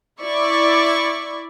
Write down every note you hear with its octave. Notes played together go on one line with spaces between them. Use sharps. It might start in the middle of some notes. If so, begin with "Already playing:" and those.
E4 D5 C#6